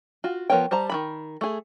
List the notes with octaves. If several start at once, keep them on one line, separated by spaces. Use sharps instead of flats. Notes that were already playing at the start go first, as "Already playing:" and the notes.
F4 F#4
F3 B3 A#4 C#5 G5
G3 C5 A5 A#5
D#3 F#3 B5
A3 G#4